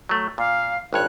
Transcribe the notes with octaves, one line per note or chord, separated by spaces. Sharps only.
F#3 A3
A#2 F5
G#1 G2 C#5 F#6